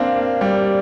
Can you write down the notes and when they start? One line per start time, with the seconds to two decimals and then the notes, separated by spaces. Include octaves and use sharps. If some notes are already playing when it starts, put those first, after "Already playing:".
Already playing: A#3 C4 D4 F5
0.16 A#3
0.40 G3 D5